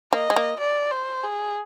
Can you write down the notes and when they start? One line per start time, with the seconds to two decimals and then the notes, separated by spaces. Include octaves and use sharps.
0.13 A#3 D#5
0.30 G#3
0.36 A#3
0.60 D5
0.92 C5
1.24 G#4